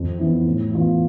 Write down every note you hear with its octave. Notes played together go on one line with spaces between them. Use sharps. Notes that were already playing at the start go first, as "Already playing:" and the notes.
Already playing: F2
E3 B3 E4
A2
E3 B3 F4